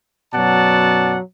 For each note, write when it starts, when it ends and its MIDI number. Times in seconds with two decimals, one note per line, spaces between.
0.35 1.18 42
0.35 1.18 47
0.35 1.18 54
0.35 1.18 74
0.35 1.18 78
0.35 1.18 81